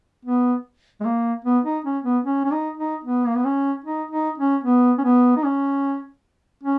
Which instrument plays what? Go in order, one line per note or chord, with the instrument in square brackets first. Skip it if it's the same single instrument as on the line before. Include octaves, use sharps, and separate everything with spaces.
[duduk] B3
G#3
A#3
B3
D#4
C#4
B3
C#4
C#4
D#4
D#4
B3
A#3
B3
C#4
D#4
D#4
C#4
B3
C#4
B3
D#4
C#4
C#4